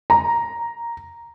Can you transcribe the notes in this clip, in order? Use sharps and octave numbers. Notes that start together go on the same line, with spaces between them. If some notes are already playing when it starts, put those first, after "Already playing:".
A#5